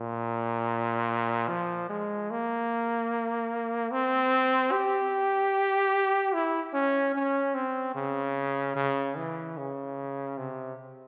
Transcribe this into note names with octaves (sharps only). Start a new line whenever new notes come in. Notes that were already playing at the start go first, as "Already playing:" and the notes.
Already playing: A#2
F3
G#3
A#3
C4
G4
E4
C#4
C#4
C4
C#3
C#3
E3
C#3
C3